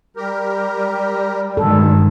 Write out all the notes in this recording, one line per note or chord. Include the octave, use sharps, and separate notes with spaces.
G3 G4 A#4
G2 B2 D#3 G#3 A4